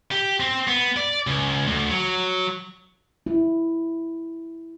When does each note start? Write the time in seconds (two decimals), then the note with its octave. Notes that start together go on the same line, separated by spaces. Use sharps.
0.11 G4
0.40 C4
0.67 B3
0.97 D5
1.27 C#2
1.68 D2
1.90 F#3
3.26 E4